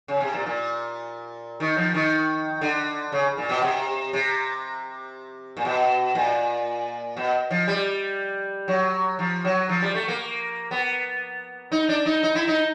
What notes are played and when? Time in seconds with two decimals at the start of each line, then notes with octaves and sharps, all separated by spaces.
0.08 C#3
0.20 C3
0.34 A#2
0.46 A#2
1.60 D#3
1.77 F3
1.94 D#3
2.61 D3
3.12 C#3
3.37 A#2
3.49 B2
3.62 C3
4.13 C3
5.57 A#2
5.65 B2
6.15 A#2
7.17 B2
7.51 F3
7.68 G3
8.68 F#3
9.19 F3
9.45 F#3
9.69 F3
9.82 G3
9.95 A3
10.08 A#3
10.71 B3
11.72 D#4
11.89 D4
12.06 D#4
12.23 D#4
12.35 E4
12.48 D#4